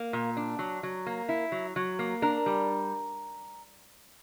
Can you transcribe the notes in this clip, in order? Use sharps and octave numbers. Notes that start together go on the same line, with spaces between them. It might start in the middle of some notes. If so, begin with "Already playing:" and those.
Already playing: A#3
A#2
D4
F#3
F#3
A#3
E4
F#3
F#3
A#3
D4 A#4
G3